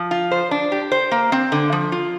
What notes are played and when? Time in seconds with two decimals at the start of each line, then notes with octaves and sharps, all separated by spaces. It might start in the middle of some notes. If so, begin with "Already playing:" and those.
Already playing: F3
0.11 F4
0.31 C5
0.51 D4
0.72 G4
0.92 C5
1.11 A#3
1.32 C4
1.52 D3
1.73 F3
1.92 F4